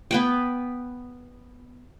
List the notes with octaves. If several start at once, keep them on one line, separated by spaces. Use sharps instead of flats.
B3 B4 G5